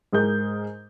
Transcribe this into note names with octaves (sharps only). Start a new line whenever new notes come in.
G#2 G#4 A#4 G6